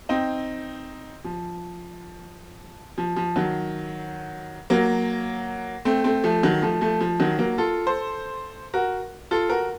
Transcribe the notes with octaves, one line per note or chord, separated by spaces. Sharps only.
C4 D#4
F3
F3
F3
D#3 F#3
F#3 A#3
A3 C4
A3 C4
F3 A3
D#3 F#3
F3 A3
F3 A3
F3
D#3 F#3
F#3 A#3
F4 A4
A4 C5
F#4 A#4
F4 A4
F#4 A#4